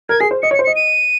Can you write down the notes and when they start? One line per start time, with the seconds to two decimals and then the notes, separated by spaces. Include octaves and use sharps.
0.09 A#4 G#6
0.20 G#4 C7
0.31 C5
0.42 D#5 C#7
0.51 C#5
0.54 C#7
0.59 C5
0.64 C#7
0.67 D#5
0.76 D#7